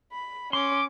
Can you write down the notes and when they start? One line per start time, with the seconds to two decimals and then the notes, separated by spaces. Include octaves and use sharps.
0.12 B5
0.53 C#4 C6 D6